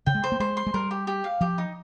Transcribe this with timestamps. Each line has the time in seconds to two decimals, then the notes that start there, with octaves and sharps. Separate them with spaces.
0.06 C#3 G5
0.15 G#3
0.24 C5
0.32 A#3
0.40 G#3 C5
0.57 C6
0.67 G#3
0.74 G3 A#4
0.91 G4
1.07 G4
1.24 F5
1.41 F3 G4
1.58 D#4